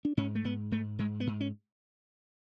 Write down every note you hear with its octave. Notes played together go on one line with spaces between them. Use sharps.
D4
G#2 C#4
A3
G#2 B3
G#2 A3
G#2 G#3
B3
G#2
C#4